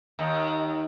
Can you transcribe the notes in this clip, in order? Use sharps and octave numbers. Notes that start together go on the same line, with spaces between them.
D#2 D#3